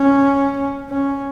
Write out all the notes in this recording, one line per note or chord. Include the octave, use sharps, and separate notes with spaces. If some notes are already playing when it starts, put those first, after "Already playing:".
Already playing: C#4
C#4